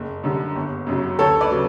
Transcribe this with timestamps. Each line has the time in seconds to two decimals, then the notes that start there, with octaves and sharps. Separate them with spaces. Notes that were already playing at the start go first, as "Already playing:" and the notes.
Already playing: F#1
0.24 F#2 D3 G3
0.56 G1
0.87 F#2 C#3 F#3
1.19 D2 A4 C#5
1.41 B4 D5
1.51 C#3 F#3